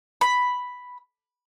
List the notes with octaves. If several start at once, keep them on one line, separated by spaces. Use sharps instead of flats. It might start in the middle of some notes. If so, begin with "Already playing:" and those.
B5